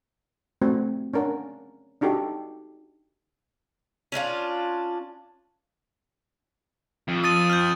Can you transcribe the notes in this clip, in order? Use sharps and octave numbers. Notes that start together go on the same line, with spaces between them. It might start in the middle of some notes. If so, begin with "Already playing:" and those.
A3 C4 F#4
C#4 D4 A#4 F#5
D4 D#4 F#4 G4 A4
C#4 D4 E4 F4
F2
D#6 A6 D#7
F6 G6